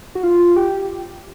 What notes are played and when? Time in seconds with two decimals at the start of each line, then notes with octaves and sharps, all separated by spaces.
0.15 F#4
0.23 F4
0.56 G4